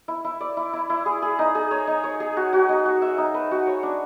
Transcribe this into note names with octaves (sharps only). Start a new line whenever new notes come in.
E4
E4
D5
E4
E4
E4
G#4
G#4
D#4
G#4
C#5
D#4
C#5
G#4
F#4
F#4
D#4
F#4
E5
D#4
B4
F#4
C#5
D4